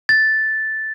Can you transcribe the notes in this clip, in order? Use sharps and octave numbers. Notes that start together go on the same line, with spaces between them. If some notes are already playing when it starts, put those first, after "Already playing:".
A6